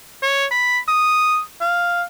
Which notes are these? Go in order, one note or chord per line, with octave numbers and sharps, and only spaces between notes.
C#5
B5
D#6
F5